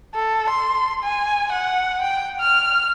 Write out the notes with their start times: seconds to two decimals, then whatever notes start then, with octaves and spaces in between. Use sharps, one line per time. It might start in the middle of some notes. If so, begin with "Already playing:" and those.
0.15 A4
0.49 C6
1.03 G#5
1.52 F#5
2.01 G5
2.40 F6